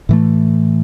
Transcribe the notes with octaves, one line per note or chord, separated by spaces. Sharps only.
A2 E3 A3